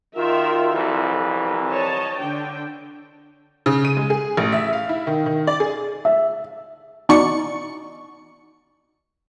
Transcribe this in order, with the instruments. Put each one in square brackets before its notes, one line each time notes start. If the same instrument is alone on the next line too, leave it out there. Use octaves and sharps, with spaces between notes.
[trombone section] D#3 F4 [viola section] F#4 A#4 E5
[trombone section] C2 F2 E3 [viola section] A4
[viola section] C4
C#5 D#5 A5
D3 D4 G5
[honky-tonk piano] C#3
D#7
G#3
G#4
A1
E5
F5
E4
D#3
D#3
D5
G#4
[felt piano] E5
[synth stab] B2 E3 D#4 D5 C#6 C#7